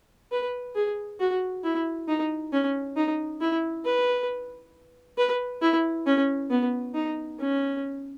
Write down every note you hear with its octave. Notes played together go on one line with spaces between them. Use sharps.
B4
G#4
F#4
E4
D#4
C#4
D#4
E4
B4
B4
E4
C#4
B3
D#4
C#4